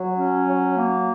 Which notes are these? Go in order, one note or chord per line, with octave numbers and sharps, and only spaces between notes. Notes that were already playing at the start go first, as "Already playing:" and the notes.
Already playing: F#3
C#4
F#3
A#3